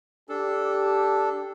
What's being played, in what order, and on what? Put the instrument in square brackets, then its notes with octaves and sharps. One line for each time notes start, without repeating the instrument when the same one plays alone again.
[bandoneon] D4 A4 [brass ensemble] G4